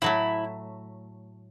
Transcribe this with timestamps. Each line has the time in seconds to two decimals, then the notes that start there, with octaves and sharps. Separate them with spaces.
0.02 A2 F#3 A3 E4